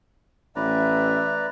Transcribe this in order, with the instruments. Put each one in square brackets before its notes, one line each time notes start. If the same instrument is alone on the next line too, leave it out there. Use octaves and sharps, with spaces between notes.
[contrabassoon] A1 [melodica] B4 D5 A#5 [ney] E5